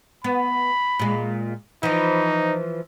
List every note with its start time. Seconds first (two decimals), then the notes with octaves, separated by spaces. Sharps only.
0.24 B3 B5
0.99 A#2 G#3
1.83 E3 F3 D#4